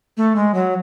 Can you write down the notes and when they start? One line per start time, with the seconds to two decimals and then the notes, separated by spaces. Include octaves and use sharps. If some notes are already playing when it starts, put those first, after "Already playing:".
0.17 A3
0.36 G#3
0.54 F#3